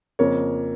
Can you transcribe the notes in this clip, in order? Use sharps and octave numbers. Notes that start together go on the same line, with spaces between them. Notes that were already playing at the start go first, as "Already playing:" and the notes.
F2 C#3 F3 A#3 C#5